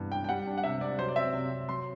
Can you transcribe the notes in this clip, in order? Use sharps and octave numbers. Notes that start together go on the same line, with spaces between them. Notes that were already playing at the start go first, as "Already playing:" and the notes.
Already playing: G2 C3 E3 B3
D4 G5
G5
G3 F#5
D4
F#5
C3 E5
C3 D5
F#3 C5
D5
C4 E5
C3
C3
F#3 C6